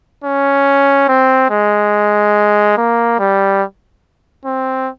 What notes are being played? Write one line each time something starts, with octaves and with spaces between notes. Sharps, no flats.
C#4
C4
G#3
A#3
G3
C4